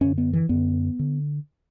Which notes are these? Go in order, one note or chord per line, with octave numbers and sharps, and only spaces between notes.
F#2 D3 C#4
B3
E3
F#2 D3 B3
D3